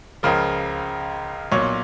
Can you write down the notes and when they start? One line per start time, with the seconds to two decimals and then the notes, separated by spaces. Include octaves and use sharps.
0.23 C#2 C#3 F3 A#4
1.52 B1 A#2 F#3 C#5